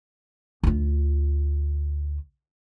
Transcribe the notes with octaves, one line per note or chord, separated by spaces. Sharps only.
D2 F4